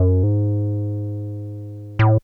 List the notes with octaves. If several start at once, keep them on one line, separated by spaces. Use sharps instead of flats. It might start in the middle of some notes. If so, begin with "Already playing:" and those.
Already playing: F#2
G#2
A2